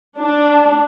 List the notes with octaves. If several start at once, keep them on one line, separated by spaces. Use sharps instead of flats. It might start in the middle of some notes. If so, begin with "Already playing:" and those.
D4